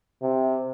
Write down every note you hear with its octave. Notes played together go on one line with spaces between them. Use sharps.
C3